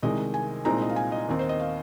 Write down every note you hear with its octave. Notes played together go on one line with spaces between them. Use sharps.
C2 C3 D#3 G#3 D#5
G#5
C2 A#2 G#3 C4 D#4 A#5
D#5
F5
G#5
D#5
D#2 D#3 C4 D#4
C5
D#5
F5